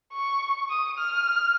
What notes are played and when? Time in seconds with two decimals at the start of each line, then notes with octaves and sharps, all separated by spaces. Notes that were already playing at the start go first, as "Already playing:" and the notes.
0.13 C#6
0.70 D#6
0.98 F6